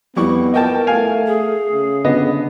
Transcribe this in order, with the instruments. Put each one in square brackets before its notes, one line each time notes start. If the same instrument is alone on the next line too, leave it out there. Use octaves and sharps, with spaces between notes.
[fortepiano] F2 G3 C#6 [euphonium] B3 [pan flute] E4
[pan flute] A#4 [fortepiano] D#5 G5 A5
[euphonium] A3 [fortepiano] F5 G#5
[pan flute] G#4
[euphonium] C#3
[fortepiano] D3 B3 D#5